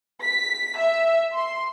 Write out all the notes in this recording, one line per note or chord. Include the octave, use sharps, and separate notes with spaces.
B6
E5
C6